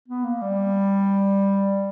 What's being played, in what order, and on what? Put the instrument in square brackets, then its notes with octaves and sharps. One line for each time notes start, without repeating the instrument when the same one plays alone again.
[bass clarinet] B3
A#3
G3